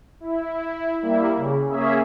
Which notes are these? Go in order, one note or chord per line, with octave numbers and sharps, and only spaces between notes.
E4
G3 A#3 E4
C#3
A#3 C#4 G#4 E5